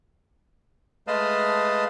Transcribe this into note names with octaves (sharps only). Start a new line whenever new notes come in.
G#3 A3 B4 D#5 F5 A5